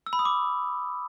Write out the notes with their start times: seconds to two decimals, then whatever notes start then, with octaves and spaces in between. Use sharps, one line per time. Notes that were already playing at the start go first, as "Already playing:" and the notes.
0.06 E6
0.13 B5
0.19 D#6
0.25 D6